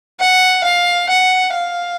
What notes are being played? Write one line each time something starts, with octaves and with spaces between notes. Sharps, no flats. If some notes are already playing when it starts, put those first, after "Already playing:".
F#5
F5
F#5
F5